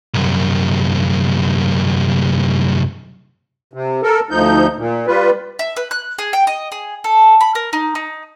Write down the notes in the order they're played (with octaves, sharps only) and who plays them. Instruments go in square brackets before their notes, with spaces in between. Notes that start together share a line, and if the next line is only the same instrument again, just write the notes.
[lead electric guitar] C2 F#2
[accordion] C3
A4 A#4
D2 F3 D#4 G6
A#2
G3 F4 B4
[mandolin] E5
B4
F#6
G#4
G5
D#5
G#4
A4
B5
A#4
D#4
D#4